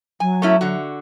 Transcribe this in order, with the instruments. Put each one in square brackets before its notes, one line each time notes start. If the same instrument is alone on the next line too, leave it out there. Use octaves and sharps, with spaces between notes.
[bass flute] F#3 [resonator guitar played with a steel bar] G#5
[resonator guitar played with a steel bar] A3 C#4 E4
D3 F#4